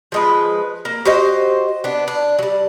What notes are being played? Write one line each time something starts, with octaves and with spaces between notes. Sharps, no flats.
F3 G#3 B4
A#3
F#4 G4 C5 D#5
B3 D4
D4
F#3 G3